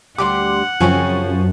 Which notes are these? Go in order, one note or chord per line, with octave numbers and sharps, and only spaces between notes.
D2 G3 G4 F#5 C6 D6
F#2 C#3 F3 C4 C#4 G#5 C#6